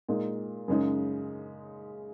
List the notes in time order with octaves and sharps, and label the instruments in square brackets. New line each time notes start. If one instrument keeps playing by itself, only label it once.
[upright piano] A#2 G#3 D#4
F#2 C#3 G#3 D#4